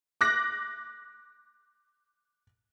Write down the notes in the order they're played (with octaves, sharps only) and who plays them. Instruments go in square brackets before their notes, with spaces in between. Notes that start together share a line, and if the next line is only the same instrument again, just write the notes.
[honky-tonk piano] D6 F#6 A#6